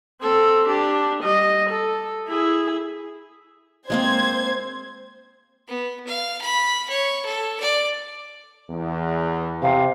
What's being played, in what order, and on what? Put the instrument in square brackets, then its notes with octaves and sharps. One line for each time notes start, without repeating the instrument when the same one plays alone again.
[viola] C4 A4
D4 G4
G3 D#5
A4
E4 G#4
[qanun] G#3 A#3 C4 [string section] C5 G#6
[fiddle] B3
F5
B5
C#5
A4
D5
[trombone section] E2
[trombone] C3 [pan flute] F5